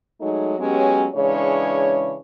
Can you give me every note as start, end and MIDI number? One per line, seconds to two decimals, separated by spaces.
0.21 0.54 54
0.21 0.54 56
0.21 0.54 57
0.21 0.54 63
0.59 1.07 54
0.59 1.07 56
0.59 1.07 59
0.59 1.07 61
0.59 1.07 67
1.15 2.16 49
1.15 2.16 52
1.15 2.16 56
1.15 2.16 62
1.15 2.16 73